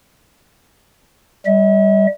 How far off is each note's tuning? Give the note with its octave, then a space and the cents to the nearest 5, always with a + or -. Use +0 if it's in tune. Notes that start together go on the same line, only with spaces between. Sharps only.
G3 +0 E5 -45